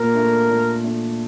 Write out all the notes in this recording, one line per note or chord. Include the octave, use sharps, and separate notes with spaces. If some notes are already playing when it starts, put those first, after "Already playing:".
Already playing: A#2 A#4
A3 D4
A#2
A3 D4